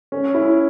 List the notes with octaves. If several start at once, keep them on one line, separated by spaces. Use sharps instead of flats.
C#4
E4